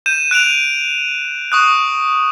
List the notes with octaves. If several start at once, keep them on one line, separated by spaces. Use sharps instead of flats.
G6 D#7 E7
F#6 D7 D#7 F7
C#6 D#6 F#6